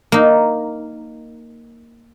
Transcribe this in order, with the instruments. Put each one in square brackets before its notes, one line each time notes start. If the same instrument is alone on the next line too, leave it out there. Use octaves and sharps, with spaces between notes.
[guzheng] A#3 D#4